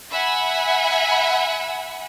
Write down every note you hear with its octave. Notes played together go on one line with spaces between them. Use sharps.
E5 F#5 G#5 B5